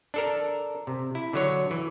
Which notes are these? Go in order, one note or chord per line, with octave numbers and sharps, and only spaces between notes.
D4 A4 A#4
C3
E4
D3 F#3 C#5
E3